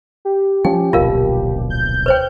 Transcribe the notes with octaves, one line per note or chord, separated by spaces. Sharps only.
G4
F3 C#4 G5
D1 A#1 B2 F4 A#4 F5
G6
B4 C5 G5